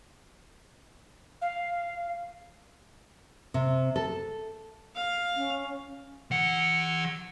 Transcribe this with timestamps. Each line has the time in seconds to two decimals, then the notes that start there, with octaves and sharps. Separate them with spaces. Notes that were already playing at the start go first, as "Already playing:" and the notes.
1.42 F5
3.54 C3
3.96 A4
4.95 F5
5.37 C#4
6.31 E3 F#5